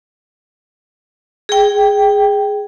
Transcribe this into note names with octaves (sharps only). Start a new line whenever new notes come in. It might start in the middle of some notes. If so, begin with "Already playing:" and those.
G#4 G5